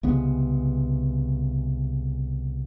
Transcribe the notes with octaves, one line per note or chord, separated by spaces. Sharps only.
C2 C#3 G#3 B3